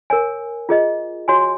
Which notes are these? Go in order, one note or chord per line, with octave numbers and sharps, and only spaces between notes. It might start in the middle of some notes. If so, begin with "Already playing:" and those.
A#4 C#5 G#5
F4 G#4 D#5
F#4 C#5 G#5 C6